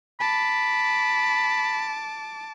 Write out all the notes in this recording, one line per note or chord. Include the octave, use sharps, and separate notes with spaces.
A5 B5 D6